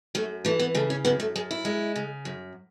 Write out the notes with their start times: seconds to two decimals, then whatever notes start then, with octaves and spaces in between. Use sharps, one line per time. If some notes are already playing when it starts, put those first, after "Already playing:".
0.15 F#2 A3
0.45 E3 A3
0.59 B3
0.75 C#3 A3
0.90 C#4
1.05 F#2 B3
1.20 A3
1.35 F#2 G#4
1.51 E4
1.65 G#3
1.96 C#3
2.25 F#2